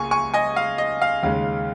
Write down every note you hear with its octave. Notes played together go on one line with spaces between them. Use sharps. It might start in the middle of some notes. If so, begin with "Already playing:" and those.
Already playing: C#2 C#3 A#3 G#5 C#6
G#5 C#6
D#5 G#5
F5
D#5
F5
D#2 C#3 G#3 F5